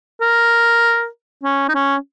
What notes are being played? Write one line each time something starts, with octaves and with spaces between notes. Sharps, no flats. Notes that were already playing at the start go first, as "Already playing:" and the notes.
A#4
C#4
D#4
C#4